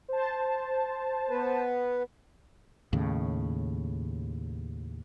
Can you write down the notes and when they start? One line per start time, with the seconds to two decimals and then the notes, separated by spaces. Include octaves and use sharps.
0.09 C5 A5
1.30 B3 B4
2.93 D#2 A2 C#3